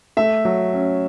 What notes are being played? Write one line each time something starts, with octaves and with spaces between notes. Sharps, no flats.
A3 E5
F#3
C#4